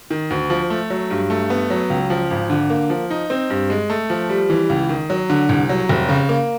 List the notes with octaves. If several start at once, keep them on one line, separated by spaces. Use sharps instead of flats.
D#3
D2
F3
A3
F#3
G2
A3
B3
F#3
C#2
F3
G#1
D3
A#3
F3
D#4
C4
G2
G#3
A3
F3
G3
E3
C#2
D#3
F#3
D3
C2
F#3
F1
C#3
A#3